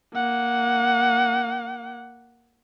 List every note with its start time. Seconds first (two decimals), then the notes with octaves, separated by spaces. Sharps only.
0.14 A#3 F#5